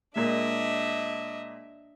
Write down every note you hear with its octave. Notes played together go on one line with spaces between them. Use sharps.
A#2 G#3 D4 D#5 E5